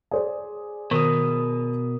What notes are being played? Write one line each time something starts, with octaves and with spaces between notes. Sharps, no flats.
G#4 C5 D5
B2 D#3 F#4 A#4 D#6